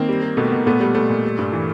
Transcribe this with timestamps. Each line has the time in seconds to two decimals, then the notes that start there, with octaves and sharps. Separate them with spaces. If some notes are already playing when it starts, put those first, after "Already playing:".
Already playing: D#3 A#3 C4
0.09 G3
0.22 G3
0.37 B2 A3 B3
0.52 B2
0.66 A#2 A3 B3
0.80 G3 A3
0.95 G3 A3
1.09 A#2
1.25 G3
1.39 G2
1.53 E3